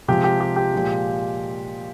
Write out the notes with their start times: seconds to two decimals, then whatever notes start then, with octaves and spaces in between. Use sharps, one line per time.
0.08 C3 F3 G#3 G4
0.24 G4
0.40 G4
0.56 G4
0.74 A#2 F3 G#3